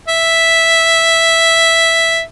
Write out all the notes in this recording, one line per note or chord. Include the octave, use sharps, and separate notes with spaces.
E5